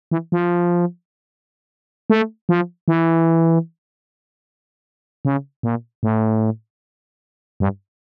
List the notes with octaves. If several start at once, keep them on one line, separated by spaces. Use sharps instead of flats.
E3
F3
A3
F3
E3
C#3
A#2
A2
G2